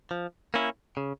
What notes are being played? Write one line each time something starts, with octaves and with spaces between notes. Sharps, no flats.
F3
A#3 C#4 E4
C#3